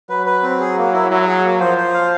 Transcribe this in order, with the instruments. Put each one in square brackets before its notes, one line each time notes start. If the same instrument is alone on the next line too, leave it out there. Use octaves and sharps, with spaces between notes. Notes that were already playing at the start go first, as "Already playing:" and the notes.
[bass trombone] F#3 [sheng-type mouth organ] B4
[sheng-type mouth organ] B4
C4
G#4
A#3
E4
[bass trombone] F#3 [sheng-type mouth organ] E4
[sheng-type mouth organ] G#4
A#3
[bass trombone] F3 [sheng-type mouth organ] C5
[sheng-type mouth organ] C5
F5